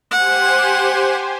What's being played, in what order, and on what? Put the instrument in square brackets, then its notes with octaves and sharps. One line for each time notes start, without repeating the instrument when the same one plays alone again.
[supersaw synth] G4 C5 G#5 [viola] F#5